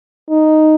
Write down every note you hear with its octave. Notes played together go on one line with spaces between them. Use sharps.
D#4